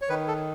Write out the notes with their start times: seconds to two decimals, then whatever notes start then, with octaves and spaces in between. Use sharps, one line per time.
0.02 C#5
0.09 D#3 B4
0.28 A4